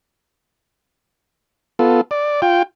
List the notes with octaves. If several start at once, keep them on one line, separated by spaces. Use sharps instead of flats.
B3 F4 A4
D5
F4 G5